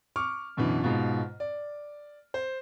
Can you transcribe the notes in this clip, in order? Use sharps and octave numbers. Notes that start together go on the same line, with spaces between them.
C#6 D6 F6
F#2 B2 D3 E3
G#2 B2 F4
D5
C5